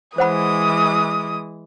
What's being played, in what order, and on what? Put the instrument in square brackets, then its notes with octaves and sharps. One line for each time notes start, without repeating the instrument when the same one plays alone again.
[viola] E3 G#3 [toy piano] C5 F#5 B5 [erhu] D#6